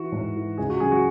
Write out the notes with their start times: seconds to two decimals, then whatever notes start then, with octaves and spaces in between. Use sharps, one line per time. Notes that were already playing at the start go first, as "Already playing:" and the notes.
Already playing: E3 F#4
0.12 G#2
0.36 E3
0.57 C#2 G#4
0.70 F#4
0.80 C#3 F#3 G#4
0.92 F#4